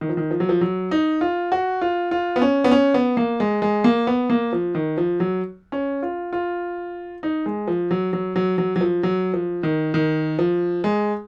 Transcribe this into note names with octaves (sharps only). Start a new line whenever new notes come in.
D#3
F3
D#3
F3
F#3
F3
F#3
D#4
F4
F#4
F4
F4
B3
C#4
B3
C#4
B3
A#3
G#3
G#3
A#3
B3
A#3
F3
D#3
F3
F#3
C#4
F4
F4
D#4
G#3
F3
F#3
F#3
F#3
F#3
F#3
F3
F#3
F3
D#3
D#3
F3
G#3